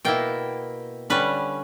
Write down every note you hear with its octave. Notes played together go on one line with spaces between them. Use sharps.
B2 A#3 E4 G5
D3 G3 C#4 B4